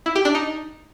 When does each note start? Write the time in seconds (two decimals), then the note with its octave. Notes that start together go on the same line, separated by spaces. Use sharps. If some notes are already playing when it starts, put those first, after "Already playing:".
0.06 E4
0.15 G4
0.25 D4
0.35 D#4